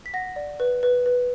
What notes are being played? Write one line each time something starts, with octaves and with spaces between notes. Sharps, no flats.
B6
F#5 A#6
D5
B4
B4
B4